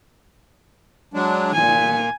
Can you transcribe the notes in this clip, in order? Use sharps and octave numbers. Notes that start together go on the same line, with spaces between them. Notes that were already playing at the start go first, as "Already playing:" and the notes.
F#3 G#3 D4
A#2 G#5